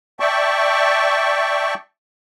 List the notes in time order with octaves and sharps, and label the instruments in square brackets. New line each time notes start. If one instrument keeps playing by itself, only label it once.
[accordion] D5 E5 G5 A5 C#6